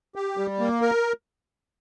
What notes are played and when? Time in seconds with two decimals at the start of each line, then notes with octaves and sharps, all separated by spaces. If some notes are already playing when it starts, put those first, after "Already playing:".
0.15 G4
0.37 G3
0.60 A#3
0.82 A#4